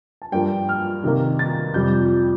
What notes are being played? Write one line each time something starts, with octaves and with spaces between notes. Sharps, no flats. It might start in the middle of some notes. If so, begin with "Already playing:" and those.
A5
G2 F3 A#3 G5
F6
C3 D#3 A#3
A6
F2 C3 G3 G6